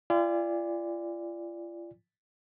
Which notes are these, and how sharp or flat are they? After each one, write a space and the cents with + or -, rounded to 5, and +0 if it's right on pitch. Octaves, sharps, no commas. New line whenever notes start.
F4 -40 D5 +0 G#5 -40